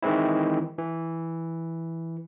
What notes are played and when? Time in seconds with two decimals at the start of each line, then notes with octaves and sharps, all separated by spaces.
0.02 D#3 E3 G#3 C4 E4
0.78 E3